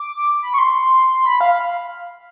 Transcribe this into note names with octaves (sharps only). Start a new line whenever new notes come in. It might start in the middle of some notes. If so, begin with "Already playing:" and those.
Already playing: D6
B5
C#6
C6
B5
F5